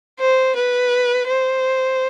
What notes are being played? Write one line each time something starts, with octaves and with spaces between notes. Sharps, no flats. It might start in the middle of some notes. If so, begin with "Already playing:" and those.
C5
B4
C5